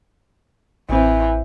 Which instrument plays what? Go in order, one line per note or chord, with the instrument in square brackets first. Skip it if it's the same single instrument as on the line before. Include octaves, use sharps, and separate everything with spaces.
[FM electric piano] A1 C4 [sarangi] E3